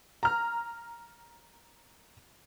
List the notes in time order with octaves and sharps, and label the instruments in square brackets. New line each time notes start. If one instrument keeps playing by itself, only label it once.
[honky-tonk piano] A#5 F6